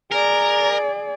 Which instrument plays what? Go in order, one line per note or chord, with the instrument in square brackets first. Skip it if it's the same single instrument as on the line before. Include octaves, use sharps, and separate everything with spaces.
[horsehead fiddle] G#4 D5 [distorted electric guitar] A#4